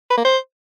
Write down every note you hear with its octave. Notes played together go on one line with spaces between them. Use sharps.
B4
A#3
C5